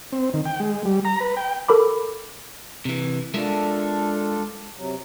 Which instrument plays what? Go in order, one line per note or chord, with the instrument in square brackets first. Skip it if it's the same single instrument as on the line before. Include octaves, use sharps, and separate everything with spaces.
[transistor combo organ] C4
D#3
G5
G#3
G3
A#5
B4
G5
[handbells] A4 A#4 B5 D6
[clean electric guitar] C3 E3
[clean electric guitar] G#3 A#4 E5 [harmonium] D4 F4 A4
[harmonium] C3 F#3